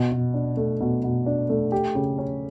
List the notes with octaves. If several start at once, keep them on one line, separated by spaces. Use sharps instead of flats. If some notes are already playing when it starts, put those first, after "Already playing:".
Already playing: B2
B2
D4
A3
B2
B2
D4
A3
G4
C#3
C#4